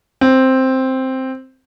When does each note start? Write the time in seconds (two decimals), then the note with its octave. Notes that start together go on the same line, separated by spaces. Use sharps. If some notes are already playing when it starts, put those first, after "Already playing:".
0.21 C4